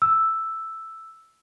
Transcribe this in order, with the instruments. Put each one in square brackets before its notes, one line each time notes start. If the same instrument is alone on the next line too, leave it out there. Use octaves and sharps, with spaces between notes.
[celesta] E6